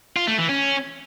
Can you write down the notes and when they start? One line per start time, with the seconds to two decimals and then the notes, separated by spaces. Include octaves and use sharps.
0.16 F4
0.27 A3
0.38 E3
0.49 C#4